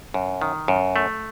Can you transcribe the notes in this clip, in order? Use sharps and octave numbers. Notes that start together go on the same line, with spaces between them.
F#2
D#3
F#2
A3